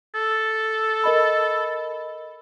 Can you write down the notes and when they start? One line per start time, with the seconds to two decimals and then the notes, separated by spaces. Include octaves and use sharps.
0.14 A4
1.04 A#4 D#5 B5